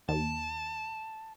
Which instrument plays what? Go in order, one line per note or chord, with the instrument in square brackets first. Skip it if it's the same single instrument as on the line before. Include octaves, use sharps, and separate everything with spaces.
[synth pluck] D#2 [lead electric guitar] A5